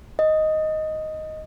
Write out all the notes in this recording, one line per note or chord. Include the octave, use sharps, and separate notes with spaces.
D#5